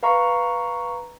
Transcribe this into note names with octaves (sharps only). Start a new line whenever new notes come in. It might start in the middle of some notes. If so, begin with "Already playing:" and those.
B4 F5 A#5 C#6